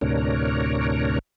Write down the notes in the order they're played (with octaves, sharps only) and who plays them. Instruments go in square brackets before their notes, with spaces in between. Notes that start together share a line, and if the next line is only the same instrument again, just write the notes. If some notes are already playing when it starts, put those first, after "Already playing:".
[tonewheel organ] D2 A2 C3 D4 A#4 C#5